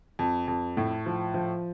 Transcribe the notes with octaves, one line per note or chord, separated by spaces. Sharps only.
F2
F2
A2
F3
F3